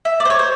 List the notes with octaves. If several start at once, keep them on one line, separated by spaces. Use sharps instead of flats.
E5
D5
C5
C#5
C5